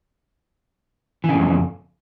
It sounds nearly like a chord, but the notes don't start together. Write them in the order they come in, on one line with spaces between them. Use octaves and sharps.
E3 C#3 G#2 F2